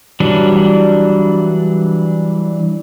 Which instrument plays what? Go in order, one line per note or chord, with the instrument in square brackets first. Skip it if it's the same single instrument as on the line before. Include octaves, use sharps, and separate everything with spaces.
[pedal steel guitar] E3 F#3 G3 D4